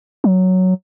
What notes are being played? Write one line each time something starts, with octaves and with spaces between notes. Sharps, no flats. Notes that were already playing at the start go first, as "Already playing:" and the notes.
F#3